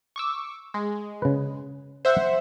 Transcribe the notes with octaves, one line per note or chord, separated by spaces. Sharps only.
C#6 D6 E6
G#3
C#3 B4
C5 E5 F#5